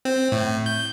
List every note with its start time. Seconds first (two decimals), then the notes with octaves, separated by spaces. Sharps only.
0.05 C4
0.32 A2
0.66 G6